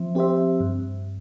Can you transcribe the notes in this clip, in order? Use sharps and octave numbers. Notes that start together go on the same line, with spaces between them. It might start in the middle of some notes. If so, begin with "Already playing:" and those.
Already playing: F3 C4 C5 E5
C4 G4 C5 E5
G2